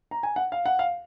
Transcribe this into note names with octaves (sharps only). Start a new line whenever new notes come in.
A#5
G#5
F#5
F5
F#5
F5